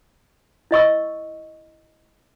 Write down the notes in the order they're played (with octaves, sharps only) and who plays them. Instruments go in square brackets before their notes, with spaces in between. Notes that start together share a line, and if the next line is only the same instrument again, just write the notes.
[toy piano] E4 D#5 C#6 E6